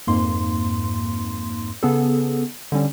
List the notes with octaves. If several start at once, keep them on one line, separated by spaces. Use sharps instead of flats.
F2 G#2 A#3 C6
C#3 B3 G#4 A4
D3 G3 C#4